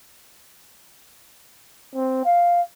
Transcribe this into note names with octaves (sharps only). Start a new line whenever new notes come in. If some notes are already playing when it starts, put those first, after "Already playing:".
C4
F5